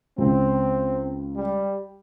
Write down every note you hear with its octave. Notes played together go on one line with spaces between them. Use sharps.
C#2 C4
G3